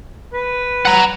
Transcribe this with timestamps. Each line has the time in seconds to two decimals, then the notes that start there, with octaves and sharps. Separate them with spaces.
0.33 B4
0.85 F#5 A#5